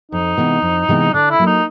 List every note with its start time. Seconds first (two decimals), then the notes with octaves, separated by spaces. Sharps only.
0.11 F2 D#4
0.38 C3 E3 G#3 B3
0.62 F2
0.89 C3 E3 G#3 B3
1.13 D3 D4
1.30 E4
1.39 F#3 A#3
1.47 D#4